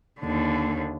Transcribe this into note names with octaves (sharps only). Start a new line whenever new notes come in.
D#2 D3